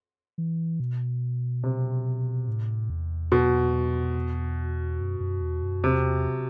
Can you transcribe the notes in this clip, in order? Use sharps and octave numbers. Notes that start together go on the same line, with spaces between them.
E3
B2
C3
A2
E2
B2
F#2
F#2
E2
F#2
E2 C3